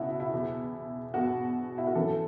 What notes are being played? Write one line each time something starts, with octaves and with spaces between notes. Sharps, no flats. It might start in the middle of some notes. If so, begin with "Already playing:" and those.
Already playing: C#2 B2 E4 F#4
E4
E2 B2
E2 B2 F#4
E4
F#4
F#2 E3 A4